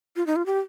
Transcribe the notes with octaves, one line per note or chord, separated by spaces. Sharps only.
F4
D#4
F4
G4